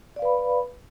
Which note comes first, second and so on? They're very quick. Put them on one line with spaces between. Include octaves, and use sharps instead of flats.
D5 F5 B4 B5